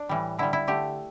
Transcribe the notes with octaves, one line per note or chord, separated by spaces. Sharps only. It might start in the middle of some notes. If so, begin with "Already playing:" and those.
Already playing: D4
A2 E3 G3
D3 G3 E4
E4
D3 A3 G4